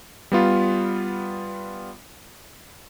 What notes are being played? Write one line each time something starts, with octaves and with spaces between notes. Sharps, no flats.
G3 B3 F4